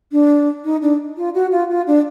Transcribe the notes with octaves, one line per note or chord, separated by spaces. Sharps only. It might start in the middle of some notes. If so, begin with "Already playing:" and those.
D4
D#4
D4
F4
F#4
F4
F4
D4